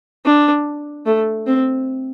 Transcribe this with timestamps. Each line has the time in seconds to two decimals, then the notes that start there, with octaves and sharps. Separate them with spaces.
0.25 D4
1.06 A3
1.46 C4